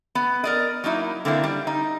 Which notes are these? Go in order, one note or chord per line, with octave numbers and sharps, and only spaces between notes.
B3
A#4 D5 D#5
F#3 A#3 D#4 E4
D3 A#3 C4 D#4 E4
G3
D#4